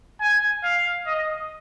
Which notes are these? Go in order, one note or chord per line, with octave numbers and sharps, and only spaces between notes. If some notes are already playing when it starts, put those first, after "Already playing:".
G#5
F5
D#5